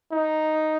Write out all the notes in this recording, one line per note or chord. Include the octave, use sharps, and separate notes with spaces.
D#4